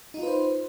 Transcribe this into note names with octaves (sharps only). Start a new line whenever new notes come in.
D#4 F4 B4 C5